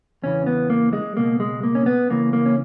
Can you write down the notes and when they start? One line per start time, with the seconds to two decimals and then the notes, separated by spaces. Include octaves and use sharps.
0.22 E2 C#3 E3 C#4
0.46 B3
0.70 A#3
0.93 G#3
1.16 C#2 B2 A#3
1.40 G#3
1.63 A#3
1.75 C#4
1.86 B3
2.10 C#2 C#3 E3 A#3
2.33 A#3
2.46 C#4